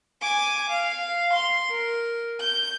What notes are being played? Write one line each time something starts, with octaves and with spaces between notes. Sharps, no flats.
G#5 D6
F5
C6
A#4
G6